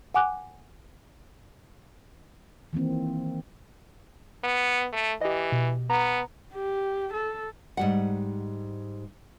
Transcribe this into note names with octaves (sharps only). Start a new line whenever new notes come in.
F#5 G#5 D6 F#6
D#3 E3 A#3 C4
B3
A3
E3 G4 D#5
B2
B3 A#5
G4
A4
G#2 G3 F#5